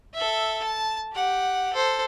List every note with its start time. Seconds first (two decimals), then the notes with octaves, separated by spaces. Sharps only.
0.14 A4 E5
0.63 A5
1.14 G4 F#5
1.73 A4 C5